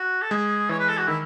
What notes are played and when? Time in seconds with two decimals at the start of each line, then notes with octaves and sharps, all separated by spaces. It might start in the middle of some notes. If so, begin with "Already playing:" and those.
Already playing: F#4
0.22 A4
0.31 G#3 G#4
0.69 E3 C#5
0.79 B4
0.89 A4
0.98 F#4
1.08 D#3 E4